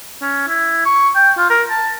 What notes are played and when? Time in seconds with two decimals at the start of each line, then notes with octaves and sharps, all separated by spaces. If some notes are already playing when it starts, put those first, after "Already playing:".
0.22 C#4
0.48 E4
0.86 C#6
1.15 G5
1.38 F4
1.50 A#4
1.70 A5